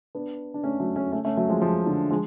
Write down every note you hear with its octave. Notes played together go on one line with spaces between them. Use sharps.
B3 D4
D4
A3 C#4
F#3 A3
A3 C#4
A3 C#4
A3 C#4
F#3 A3
F3 G#3
F3 G#3
D3
F3 G#3